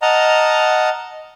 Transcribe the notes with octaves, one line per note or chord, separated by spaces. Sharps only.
D#5 F#5 A5 A#5 F6